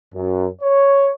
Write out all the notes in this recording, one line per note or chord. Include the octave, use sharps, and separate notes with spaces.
F#2
C#5